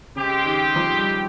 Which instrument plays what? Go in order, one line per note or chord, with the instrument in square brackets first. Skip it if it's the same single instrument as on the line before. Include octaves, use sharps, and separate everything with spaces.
[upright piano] C#3 [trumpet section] G#3 C4 G4
[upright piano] D#3
F3
G3